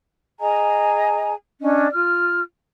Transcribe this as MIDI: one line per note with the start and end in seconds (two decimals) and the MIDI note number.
0.39 1.32 68
0.39 1.32 75
0.39 1.32 80
0.39 1.32 82
1.61 1.87 61
1.61 1.87 62
1.61 1.87 74
1.61 1.87 75
1.92 2.41 65
1.92 2.41 89